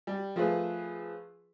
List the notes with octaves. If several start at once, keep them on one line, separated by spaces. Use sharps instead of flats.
G3
F3 A3 F4 G#4 B4